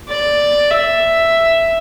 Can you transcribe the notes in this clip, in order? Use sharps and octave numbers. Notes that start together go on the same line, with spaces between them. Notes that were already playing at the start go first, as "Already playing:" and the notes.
D5
E5